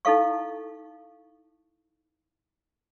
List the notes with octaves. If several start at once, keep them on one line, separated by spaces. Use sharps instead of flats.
D#4 E4 A4 F5 C#6